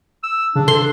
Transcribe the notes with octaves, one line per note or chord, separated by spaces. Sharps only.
E6
C#3 D4
A4 C6